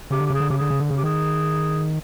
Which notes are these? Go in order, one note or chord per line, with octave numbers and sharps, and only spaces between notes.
C#3 G4
D3
G4
C#3 G#4
D3
C#3 G4
D3 G#4
C#3
D3
C#3 G#4
G4
D#3 G#4